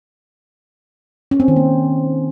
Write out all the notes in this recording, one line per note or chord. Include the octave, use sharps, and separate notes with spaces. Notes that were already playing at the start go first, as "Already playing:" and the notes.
C#4
C4
D#3
A#3